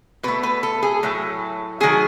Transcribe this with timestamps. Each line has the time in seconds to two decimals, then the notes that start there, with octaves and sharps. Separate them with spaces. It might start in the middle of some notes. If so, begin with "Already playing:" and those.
0.23 B2 A3 B4
0.43 B4
0.63 A4
0.83 G#4
1.03 A2 F#3 A3
1.80 D#3 F#3 A3 G#4